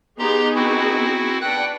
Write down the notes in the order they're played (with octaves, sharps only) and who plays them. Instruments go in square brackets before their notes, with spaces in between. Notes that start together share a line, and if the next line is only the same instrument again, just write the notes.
[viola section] B3 D#4 G#4 [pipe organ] G4 A#5 C6
[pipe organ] C4 E4 F#4
[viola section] D4 B4 [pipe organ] F#5 G5 F#6